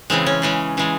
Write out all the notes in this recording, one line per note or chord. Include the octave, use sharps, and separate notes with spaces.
C#3 E3 G#3 C4
C#4
C#3 E3 G#3 C#4
C#3 E3 G#3